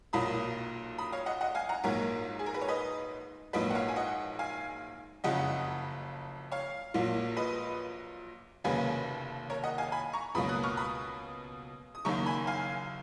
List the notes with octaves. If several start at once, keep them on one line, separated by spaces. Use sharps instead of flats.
B1 A#2 F#3 A#3 B5 D#6
B5 D#6
C#5 F5
D#5 F#5
D#5 F#5
F5 G#5
F#5 A#5
A#1 G#2 F#3 A#3 A#4 C#5
G#4
A#4
B4
C#5
B4 D#5
A#1 G#2 F#3 A#3 B4 D#5
F#5
C#5 F5
G#5
D#5 F#5
F5 G#5
F#1 F2 C#3 F#3 D#5 F#5
C#5 F5
A#1 A#2 F#3 A#3
B4 D#5
F1 D#2 C#3 F#3 A#3 G#4 B4
A#4 C#5
D#5 F#5
F5 G#5
G#5 B5
A#5 C#6
C#2 B2 F#3 A#3 B5 D#6
D#6 F#6
C#6 F6
B5 D#6
D#6
F#1 F#2 D#3 A#3 A#5 C#6
G#5 B5
F5 G#5